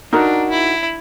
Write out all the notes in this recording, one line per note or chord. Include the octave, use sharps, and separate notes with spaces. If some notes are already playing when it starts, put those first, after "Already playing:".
D4 D#4 F#4 A#4
E4